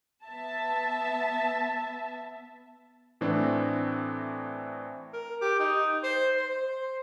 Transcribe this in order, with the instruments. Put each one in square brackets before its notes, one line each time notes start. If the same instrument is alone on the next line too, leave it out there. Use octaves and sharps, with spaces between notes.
[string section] B3 E5 A5
[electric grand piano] A2 E3 C4 D4
[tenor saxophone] A#4
G4
D#4
C5
C5